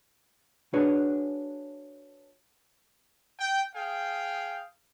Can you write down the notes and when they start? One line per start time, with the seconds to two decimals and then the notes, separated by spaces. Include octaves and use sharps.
0.73 D4 F#4 G#4 B4 C#5
3.38 G5
3.74 G#4 F5 G5